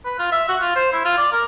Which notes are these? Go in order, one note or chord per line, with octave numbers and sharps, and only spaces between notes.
B4
F4
E5
F#4
F4
C5
E4
F4
D5
A#4